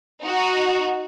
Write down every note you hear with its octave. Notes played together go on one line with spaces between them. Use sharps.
D#4 F#4